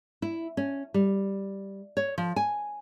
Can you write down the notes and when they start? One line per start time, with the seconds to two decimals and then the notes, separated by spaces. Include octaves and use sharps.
0.22 E4
0.57 C#4
0.94 G3
1.97 C#5
2.18 F3
2.36 G#5